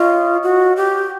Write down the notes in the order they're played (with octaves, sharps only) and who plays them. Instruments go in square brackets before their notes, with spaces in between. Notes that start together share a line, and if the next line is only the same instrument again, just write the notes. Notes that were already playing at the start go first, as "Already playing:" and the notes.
Already playing: [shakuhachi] F4 [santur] C#5 D#5
[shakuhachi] F#4
G4